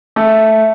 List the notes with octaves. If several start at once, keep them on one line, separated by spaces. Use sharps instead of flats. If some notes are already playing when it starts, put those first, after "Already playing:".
A3